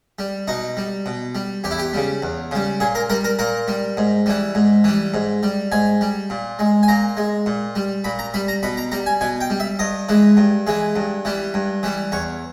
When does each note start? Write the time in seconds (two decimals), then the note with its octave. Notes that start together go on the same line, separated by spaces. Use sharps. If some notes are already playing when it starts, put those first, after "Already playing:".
0.19 G3
0.48 B2 D#4
0.77 G3
1.06 B2
1.35 G3
1.64 E2 G4
1.71 E4
1.79 G4
1.93 C#3 G3
2.22 E2
2.51 C#3 G3
2.80 A#2 G#4
2.95 A#4
3.10 G3 A#4
3.24 A#4
3.39 A#2 A#4
3.68 G3
3.97 G#2
4.26 E3 G3
4.55 G#2
4.84 E3 G3
5.14 G#2
5.43 G3
5.72 G#2 G#5
6.01 G3
6.30 A#2
6.59 G#3
6.83 G#5
6.88 A#2 A#5
7.17 G#3
7.46 A#2
7.75 G3
8.04 A#2 B5
8.19 A#5
8.34 G3 B5
8.48 A#5
8.63 B2 B5
8.77 A#5
8.92 G3 A#5
9.06 G#5
9.21 B2 G#5
9.41 G5
9.50 G3
9.60 E5
9.79 G2 D#5
10.09 E3 G#3
10.37 G2
10.67 E3 G#3
10.96 G2
11.25 E3 G3
11.54 G2
11.83 E3 G3
12.12 E2 C#5